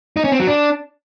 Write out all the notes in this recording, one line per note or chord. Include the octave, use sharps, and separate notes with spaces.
D#4
C#4
C4
F#3
D4